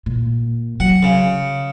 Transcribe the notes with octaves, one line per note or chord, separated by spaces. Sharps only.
A#2
F#3 F#5
C#3